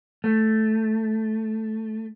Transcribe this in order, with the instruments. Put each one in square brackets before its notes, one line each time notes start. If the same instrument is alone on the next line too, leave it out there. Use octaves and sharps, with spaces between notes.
[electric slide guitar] A3